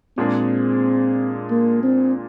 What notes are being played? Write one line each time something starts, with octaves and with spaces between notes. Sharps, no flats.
A#2 G#3 C4 D4 G#4
A#3
C4